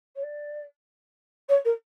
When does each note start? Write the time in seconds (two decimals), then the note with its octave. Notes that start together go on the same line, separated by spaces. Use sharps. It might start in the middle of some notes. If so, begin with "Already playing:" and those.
0.15 C#5
0.22 D5
1.48 C#5
1.64 A#4